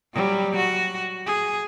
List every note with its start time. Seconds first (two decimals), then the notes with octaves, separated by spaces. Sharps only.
0.14 F#3 G3
0.56 F#4
1.26 G#4